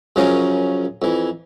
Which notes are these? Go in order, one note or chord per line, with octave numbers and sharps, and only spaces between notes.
F#2 C#3 F3 C#4 A#4 D#6
F2 E3